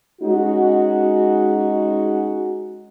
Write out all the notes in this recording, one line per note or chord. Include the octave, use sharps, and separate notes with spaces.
G#3 C#4 D#4 F#4